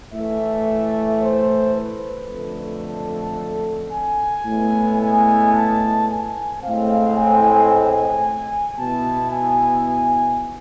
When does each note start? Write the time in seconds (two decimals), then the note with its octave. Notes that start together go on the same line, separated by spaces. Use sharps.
0.13 A2 E3 A3 E5
1.21 C5
1.75 B4
2.29 F2 D3 A3
2.83 A4
3.91 G#5
4.46 A2 G#3 B3 E4
5.00 G#5
5.54 A5
6.08 G#5
6.62 A2 G#3 C4 F5
7.16 G#5
7.70 G#5
8.79 B2 B3 E4 A5
9.32 G#5